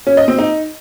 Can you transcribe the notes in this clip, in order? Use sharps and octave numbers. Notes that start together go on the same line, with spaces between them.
C#4
D#5
C4
D#4